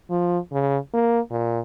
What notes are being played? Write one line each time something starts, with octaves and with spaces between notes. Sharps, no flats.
F3
C#3
A#3
A#2